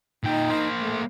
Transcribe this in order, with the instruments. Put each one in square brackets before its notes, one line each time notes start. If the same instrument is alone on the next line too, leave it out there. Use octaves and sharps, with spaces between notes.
[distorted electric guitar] A#2 G5 [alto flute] D#4
[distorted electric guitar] A#3 C5
[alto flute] A3